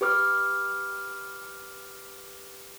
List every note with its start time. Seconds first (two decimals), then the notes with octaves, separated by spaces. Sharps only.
0.01 G4 B4 D6 F6